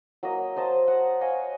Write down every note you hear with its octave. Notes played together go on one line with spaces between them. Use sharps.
F#3 A#3 D#5
C5 D#5 A5
F#5
C#5 D#5 F5 G#5